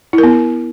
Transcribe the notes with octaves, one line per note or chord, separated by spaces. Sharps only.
E4
A#4
B3